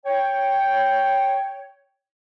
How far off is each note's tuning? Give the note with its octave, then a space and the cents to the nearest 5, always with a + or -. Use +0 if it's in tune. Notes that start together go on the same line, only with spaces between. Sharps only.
C#5 +0 G5 +0